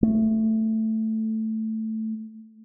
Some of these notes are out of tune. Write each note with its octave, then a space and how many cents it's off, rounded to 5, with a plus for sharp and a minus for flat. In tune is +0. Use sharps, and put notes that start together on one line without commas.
A3 +5